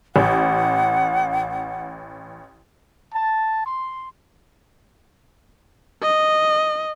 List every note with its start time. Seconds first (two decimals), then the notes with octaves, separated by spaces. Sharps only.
0.16 A1 F#5
3.13 A5
3.66 C6
6.02 D#5